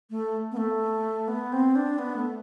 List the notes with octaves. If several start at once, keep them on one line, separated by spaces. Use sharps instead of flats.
A3
B3
A3
B3
C4
D4
B3
A3